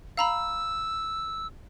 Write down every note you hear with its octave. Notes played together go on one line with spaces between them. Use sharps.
F5 A#5 B5 E6